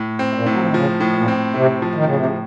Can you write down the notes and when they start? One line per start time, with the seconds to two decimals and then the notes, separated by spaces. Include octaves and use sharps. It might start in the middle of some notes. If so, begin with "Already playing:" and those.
Already playing: A2
0.19 C4
0.33 A#2
0.46 A2
0.52 F#3
0.59 F3
0.67 D#3
0.74 C#3 F3
1.00 A2
1.14 A#2
1.28 C4
1.55 A2 C3
1.82 F3
1.95 D#3
2.05 A2 C#3
2.16 C3
2.26 C#3